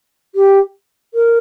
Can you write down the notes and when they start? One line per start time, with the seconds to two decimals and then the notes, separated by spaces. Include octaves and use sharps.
0.35 G4
1.14 A#4